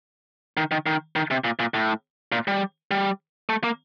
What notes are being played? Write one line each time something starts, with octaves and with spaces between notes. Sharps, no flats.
D#3
D#3
D#3
D#3
C3
A#2
A#2
A2
A#2
G3
G3
A3
A#3